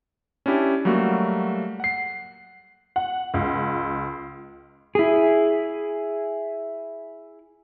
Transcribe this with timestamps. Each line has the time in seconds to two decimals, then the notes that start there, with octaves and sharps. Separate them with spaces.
0.46 C#4 D4 E4 G4
0.85 F#3 G3 A3 A#3 F#4
1.80 F#5 C7
2.96 F#5
3.34 C#2
4.95 E4 G#4